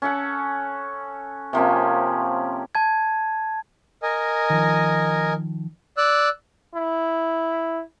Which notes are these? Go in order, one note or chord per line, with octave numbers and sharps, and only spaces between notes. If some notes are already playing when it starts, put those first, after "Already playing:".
C#4 A4 F#5
C3 F3 A#3 C#4
A5 G#6
A#4 D#5 G#5
D#3 F3
D5 E6 F#6
E4